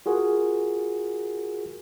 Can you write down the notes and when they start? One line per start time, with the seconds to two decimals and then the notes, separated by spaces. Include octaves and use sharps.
0.06 F4 F#4 G#4 A#4